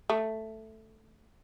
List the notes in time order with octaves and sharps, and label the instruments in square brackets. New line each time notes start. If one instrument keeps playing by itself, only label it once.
[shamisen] A3